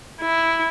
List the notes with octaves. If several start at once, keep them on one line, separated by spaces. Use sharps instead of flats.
E4